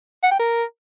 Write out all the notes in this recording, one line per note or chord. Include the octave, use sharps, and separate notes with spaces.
F#5
G5
A#4